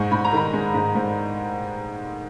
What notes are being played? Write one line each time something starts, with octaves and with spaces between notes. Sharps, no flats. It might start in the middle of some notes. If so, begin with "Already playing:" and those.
Already playing: G#2 G#3 C#6
G#2 B5
A#5
D#3 B5
G#3
G#2
G#2